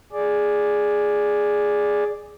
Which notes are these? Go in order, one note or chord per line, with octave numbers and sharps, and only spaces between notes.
G#4 D5